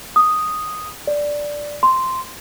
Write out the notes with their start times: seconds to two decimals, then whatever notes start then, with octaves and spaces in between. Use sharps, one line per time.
0.16 D#6
1.07 D5
1.83 C6